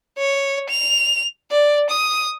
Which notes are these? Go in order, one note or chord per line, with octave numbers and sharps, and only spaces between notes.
C#5
F7
D5
D#6